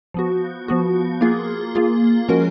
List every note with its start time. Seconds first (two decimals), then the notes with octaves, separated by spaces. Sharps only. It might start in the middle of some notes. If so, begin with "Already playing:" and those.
0.14 F3 B3 F#4
0.68 F3 B3 F#4
1.21 A#3 F4 G#4
1.75 A#3 F4 G#4
2.28 F3 G#3 C#4 F#4 A#4